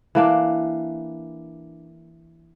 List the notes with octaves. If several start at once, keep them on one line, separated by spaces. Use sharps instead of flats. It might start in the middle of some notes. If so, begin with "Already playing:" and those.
E3 A#3 D4